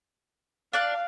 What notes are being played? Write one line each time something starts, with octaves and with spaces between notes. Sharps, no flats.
D4 D5 F5 F#6